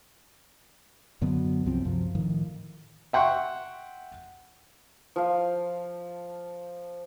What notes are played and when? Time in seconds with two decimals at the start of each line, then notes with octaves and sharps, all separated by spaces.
1.21 F#2 D3 F#3 B3
1.66 C2 F#2 F3 C4
1.85 F#2 C3 F3
2.15 A2 D#3 F3
3.13 E5 F#5 G5 C6 C#6
5.16 F3 F5